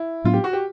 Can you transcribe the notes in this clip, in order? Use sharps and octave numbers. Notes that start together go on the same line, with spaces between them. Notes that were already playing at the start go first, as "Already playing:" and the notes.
Already playing: E4
A2 F#3 B3 D4 F4
G4
F#4
G4